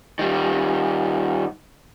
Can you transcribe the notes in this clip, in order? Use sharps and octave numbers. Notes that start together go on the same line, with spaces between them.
D#3 G3